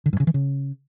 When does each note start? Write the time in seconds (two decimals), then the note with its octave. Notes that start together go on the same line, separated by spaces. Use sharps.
0.06 D3
0.13 G2
0.20 C#3
0.27 E3
0.34 C#3